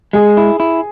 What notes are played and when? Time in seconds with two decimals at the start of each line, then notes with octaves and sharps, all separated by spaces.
0.13 G#3 G#4
0.37 E4
0.60 E4